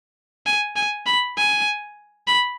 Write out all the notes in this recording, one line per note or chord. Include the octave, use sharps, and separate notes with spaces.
G#5
G#5
B5
G#5
B5